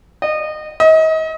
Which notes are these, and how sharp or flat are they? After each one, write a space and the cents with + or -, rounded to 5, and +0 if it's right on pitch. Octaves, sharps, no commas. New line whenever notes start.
D#5 -25
D#5 +35